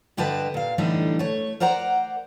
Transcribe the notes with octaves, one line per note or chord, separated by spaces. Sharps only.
G2 D3 G4 B4 D#5 A5
A#2 F5
A2 D3 E3 G3 D4 D#4
A3 C#5
A#4 C5 D5 F#5 A#5